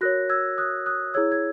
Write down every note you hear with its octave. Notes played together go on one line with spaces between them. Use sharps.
F#4 A#4 C#5 F#6 A#6
E6 G#6
D#6 F#6
D#6 F#6
E4 G#4 C#5 E6 G#6
G#6